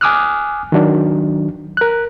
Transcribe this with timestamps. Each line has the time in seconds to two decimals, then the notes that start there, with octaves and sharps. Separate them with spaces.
0.01 G#5 D6 D#6 F6 F#6
0.72 D#3 F#3 D4
1.77 A#4 F#6